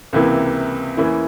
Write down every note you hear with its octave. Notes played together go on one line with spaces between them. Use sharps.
C#2 C3 E3 A#3 E4
E2 E3 A#3 C#4 E4